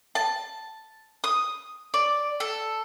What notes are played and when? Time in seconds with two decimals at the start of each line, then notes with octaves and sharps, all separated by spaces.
0.15 A5
1.24 D#6
1.94 D5
2.40 A4